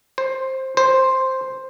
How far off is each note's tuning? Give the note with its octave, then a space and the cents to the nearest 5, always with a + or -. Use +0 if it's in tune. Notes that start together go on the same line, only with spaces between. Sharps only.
C5 +15
C5 +5